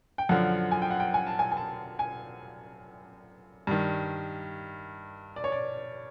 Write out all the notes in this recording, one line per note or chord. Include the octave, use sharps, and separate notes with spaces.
G5
F#2 D3 F3 F#5
G#5
G5
F#5
G5
G#5
A5
G#5
G#5
A5
G#5
G2 D#3
D5
C#5
D5